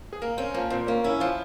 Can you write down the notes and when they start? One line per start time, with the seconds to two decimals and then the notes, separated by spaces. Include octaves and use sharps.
0.13 G#4
0.22 A#3 A#4
0.37 C4 C#4
0.54 F3 A#3
0.70 A#2 C4
0.87 A#3 C#4
1.04 C#4 E4
1.20 F3 F4